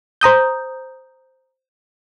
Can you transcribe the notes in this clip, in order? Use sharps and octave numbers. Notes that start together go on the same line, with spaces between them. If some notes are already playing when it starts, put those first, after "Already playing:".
C5 A#5 D#6 G6